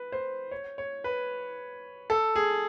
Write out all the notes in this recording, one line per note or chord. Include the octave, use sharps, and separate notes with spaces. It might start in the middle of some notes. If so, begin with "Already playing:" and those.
Already playing: B4
C5
C#5
C#5
B4
A4
G#4